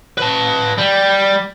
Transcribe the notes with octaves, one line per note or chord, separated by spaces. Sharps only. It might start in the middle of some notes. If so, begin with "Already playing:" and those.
B4 A5
G3